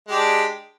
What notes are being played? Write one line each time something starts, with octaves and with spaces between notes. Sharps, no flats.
G#3 D4 G4